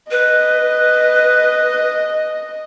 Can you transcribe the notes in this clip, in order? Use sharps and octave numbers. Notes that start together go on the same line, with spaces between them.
B4 D#5